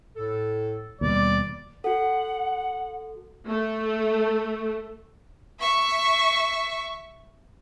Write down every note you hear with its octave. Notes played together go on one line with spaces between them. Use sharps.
A2 A4
D#2 B2 G3 D5
F#4 A4 F#5
A3
E5 C#6